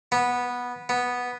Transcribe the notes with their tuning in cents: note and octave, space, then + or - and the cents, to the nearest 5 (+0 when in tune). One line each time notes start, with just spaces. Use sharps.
B3 -10
B3 -5